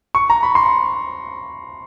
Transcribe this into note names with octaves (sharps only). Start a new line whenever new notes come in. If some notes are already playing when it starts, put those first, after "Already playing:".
C#6
A#5
B5
C6